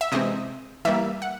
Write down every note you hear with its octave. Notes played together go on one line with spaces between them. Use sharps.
E5
C3 E3 G#3 C4 D#5
E3 G3 A#3 E5
F#5